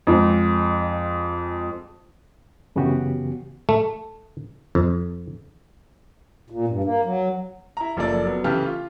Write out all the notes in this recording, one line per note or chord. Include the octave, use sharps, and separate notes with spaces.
F2 G#3
F#2 C#3 E3 B3 F#4 G4
A3
F2
A#2
G2
A#3
F#3
E4 A#5
F#1 F3 A#3 A4 D5
F#3 B3
C#3 E3 G4 A4 A5 F6
F4